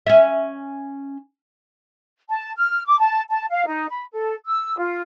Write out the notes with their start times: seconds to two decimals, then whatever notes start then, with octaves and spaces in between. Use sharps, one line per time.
0.06 C#4 E5
2.30 A5
2.57 F6
2.86 D6
3.00 A5
3.30 A5
3.51 F5
3.67 D#4
3.90 B5
4.13 A4
4.46 E6
4.78 F4